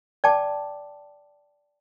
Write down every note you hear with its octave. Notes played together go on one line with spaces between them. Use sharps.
D5 G5 A5 D6